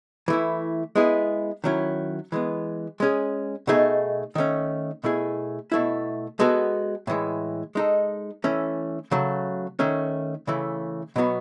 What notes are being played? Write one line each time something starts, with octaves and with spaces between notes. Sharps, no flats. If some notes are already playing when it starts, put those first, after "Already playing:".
E3 A3 E4
G#3 B3 E4 G#4
D#3 F#3 C#4 E4
E3 G#3 B3
G#3 C#4 G#4
B2 A3 D#4 G#4
D#3 A3 C#4
B2 A3 E4 G#4
B2 A3 E4
G#3 B3 F#4 A4
A2 E3 G#3
G#3 D#4 A4
E3 A3 C#4
C#3 F#3 A3
D#3 A3 C#4
C#3 E3 A3
B2 F#3 B3 F#4